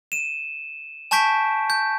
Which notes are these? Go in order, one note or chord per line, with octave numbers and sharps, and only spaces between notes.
D#7 E7
G#5 A5 C#6 G6 B6 D7
G6